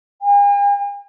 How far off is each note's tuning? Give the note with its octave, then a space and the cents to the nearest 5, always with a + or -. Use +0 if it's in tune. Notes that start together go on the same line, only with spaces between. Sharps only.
G#5 -45